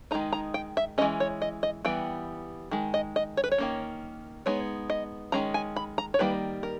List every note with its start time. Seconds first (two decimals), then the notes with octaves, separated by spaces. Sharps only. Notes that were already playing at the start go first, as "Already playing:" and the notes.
0.11 D#3 G#3 D#4 A#5
0.33 A#5
0.54 G5
0.77 E5
0.98 E3 G#3 C#4 D#5
1.20 C#5
1.42 D#5
1.63 D#5
1.85 E3 G3 B3 G5
2.71 D#3 G#3
2.94 D#5
3.16 D#5
3.37 C#5
3.44 B4
3.51 C#5
3.58 D#3 A#3 C#4
4.46 G#3 B3 D#4 C#5
4.90 D#5
5.32 D#3 G#3 C#4 A#5
5.54 G#5
5.76 B5
5.98 A#5
6.14 C#5
6.19 D#3 G3 A#3 B4
6.63 A#4